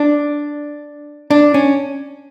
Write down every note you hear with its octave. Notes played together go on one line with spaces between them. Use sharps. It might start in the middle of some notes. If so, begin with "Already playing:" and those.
Already playing: D4
D4
C#4